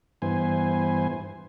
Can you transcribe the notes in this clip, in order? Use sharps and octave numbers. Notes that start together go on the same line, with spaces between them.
G2 E3 B3 C5 G#5